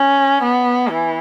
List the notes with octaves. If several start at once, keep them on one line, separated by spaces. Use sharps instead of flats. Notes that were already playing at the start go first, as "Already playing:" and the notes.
Already playing: C#4
B3
E3